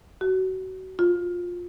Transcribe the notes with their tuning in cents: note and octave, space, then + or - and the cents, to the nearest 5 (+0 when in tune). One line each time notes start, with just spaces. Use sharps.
F#4 +25
F4 +15